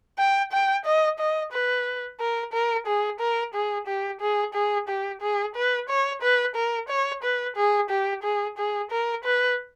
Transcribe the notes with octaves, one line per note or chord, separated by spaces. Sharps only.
G5
G5
D#5
D#5
B4
A#4
A#4
G#4
A#4
G#4
G4
G#4
G#4
G4
G#4
B4
C#5
B4
A#4
C#5
B4
G#4
G4
G#4
G#4
A#4
B4